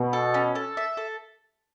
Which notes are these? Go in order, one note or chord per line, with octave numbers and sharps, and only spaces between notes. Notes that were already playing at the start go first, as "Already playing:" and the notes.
Already playing: B2
A4
C#4
A4
E5
A4